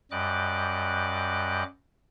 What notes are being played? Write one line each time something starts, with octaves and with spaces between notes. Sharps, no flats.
F#2 G3 D#5 D6 F#6